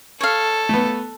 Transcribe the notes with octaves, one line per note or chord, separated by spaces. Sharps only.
A4 C#5 F5
A3 B3